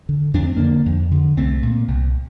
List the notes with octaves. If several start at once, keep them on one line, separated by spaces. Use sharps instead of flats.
D3
F2 D4
C4
D3 A#3 D4
F2
D3
C2 A3 C4
A#2
C2